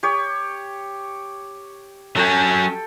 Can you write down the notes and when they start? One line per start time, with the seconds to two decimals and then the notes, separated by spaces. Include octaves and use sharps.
0.03 G4 C#5
2.17 F#3 C#4 A4 G5